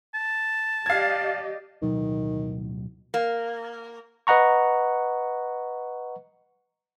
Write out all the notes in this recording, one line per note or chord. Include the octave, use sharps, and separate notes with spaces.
A5
G4 D5 D#5 F5 G#6
D1 B2 D#3 F#3
A#3
B4 D#5 F#5 A#5 C#6